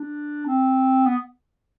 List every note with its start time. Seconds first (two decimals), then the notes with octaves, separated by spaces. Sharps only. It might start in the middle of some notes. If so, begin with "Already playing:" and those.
Already playing: D4
0.47 C4
1.06 B3